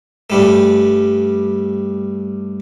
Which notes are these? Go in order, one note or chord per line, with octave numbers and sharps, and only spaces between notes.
G2 G3 A3